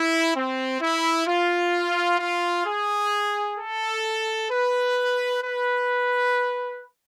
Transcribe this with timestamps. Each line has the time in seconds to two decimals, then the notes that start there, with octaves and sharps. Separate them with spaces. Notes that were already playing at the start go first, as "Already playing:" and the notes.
Already playing: E4
0.35 C4
0.81 E4
1.27 F4
2.19 F4
2.66 G#4
3.57 A4
4.51 B4
5.43 B4